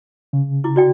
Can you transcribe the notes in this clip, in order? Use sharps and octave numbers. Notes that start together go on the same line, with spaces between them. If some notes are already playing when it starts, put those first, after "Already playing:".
C#3
E4 D6
F#4 D5 G5